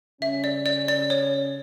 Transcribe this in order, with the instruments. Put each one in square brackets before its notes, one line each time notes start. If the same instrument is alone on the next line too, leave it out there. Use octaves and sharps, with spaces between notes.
[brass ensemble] C#3 G3 C#4 [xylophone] E5
[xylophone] D5
D5
D5
C#5